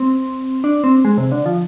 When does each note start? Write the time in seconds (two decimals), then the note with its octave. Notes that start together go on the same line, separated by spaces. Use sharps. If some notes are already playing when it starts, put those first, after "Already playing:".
Already playing: C4
0.64 D4
0.84 C4
1.05 G#3
1.18 C3
1.32 D3
1.46 F3